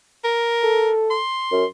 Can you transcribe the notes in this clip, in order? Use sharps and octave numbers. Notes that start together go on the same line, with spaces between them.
A#4
A4
C6
F#2